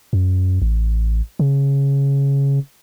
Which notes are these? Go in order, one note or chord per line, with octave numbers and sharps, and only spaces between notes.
F#2
A1
C#3